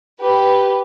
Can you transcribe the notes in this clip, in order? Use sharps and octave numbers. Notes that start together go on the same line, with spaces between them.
G4 B4